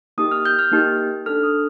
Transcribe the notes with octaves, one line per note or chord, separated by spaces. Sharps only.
A#3 D#4 G4 D#6
F6
G6
F6
A#3 D#4 G4
D4 A4 F6
D#6